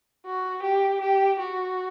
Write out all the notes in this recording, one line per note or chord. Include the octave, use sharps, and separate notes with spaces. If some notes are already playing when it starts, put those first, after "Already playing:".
F#4
G4
G4
F#4